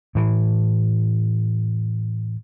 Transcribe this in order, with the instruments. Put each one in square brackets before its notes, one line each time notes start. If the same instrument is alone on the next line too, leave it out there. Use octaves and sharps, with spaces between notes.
[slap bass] A2 E3